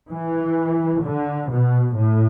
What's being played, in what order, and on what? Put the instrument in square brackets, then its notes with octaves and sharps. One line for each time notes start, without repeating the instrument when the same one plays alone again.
[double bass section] E3
D3
B2
A2